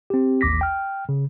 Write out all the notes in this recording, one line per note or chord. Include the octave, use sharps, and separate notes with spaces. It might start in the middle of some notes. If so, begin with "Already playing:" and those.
C4 G4
A1 D#2 D6 A#6 B6
G5 F6
C#3